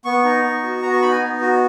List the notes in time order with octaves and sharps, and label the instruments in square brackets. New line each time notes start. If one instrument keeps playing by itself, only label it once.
[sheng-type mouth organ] B3 C#6
D#4
B3
F#4
B3 A#5
C#6
D#4 B5
G#5
B3
F#4